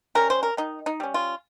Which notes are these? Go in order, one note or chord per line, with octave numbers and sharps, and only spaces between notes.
G3 C#4 A#4
C5
A#4
D#3 D#4
D#4
G3 C#4
F4